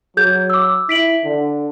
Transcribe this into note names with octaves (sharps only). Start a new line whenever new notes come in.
F#3 G#4 G6 G#6
D6 E6
E4 B6 D7 F#7
D3